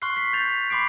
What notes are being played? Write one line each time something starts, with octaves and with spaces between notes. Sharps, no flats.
C6 C#6 F6 F#6 C7
B6 C7
G6 A6 F7
B6
B5 C6 D6 C7 D7